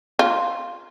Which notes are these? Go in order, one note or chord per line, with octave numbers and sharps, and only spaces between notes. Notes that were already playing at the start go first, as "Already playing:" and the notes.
F4